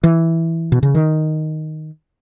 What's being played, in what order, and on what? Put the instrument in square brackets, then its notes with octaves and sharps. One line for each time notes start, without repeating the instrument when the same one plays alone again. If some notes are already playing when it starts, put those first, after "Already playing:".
[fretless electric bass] E3
B2
C#3
D#3